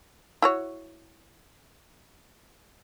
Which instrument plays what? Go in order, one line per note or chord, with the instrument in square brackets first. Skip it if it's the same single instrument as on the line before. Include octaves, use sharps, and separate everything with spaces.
[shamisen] E4 F#4 C#5